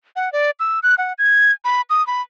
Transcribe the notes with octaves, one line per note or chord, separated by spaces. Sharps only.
F#5
D5
E6
F#6
F#5
G#6
B5
D#6
B5